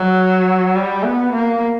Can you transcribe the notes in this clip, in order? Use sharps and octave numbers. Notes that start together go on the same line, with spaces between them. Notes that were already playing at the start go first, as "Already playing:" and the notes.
Already playing: F#3
G3
B3
A#3